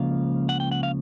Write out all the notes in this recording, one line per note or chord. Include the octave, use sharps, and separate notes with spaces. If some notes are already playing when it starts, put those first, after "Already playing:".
Already playing: C#2 C#3 F3 A#3 F5
F#5
G5
F#5
F5